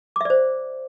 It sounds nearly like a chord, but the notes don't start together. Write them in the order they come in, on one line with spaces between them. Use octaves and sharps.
D6 E5 D5 C5